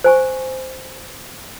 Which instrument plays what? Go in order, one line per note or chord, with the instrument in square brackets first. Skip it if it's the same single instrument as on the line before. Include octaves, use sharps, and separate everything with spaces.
[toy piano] C5 G#5 C#6